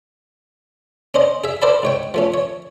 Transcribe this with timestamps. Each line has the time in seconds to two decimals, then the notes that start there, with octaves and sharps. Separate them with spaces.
1.14 C#4 D4 C5 D#5
1.44 G#4 E5
1.62 A#4 C5 D5 E5 A5 B5
1.83 G#2 C#5 G5
2.14 F3 A3 C#4
2.34 C#5